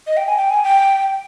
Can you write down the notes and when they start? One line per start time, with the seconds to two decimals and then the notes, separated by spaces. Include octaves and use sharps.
0.07 D#5
0.17 G5
0.27 G#5
0.38 G5
0.50 G#5
0.64 G5